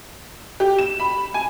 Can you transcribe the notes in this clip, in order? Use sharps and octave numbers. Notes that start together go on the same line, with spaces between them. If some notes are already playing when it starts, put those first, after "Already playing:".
G4
E7
B5
G#5